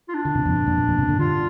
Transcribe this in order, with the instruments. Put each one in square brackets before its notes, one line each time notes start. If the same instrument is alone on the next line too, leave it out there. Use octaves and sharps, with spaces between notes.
[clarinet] F4
D4
[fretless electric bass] D3
G2 C3
F2 A#2
G2
F2 A#2
G2
F2 A#2
G2 C3
A#2 D3
[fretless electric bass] D3 G3 [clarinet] F4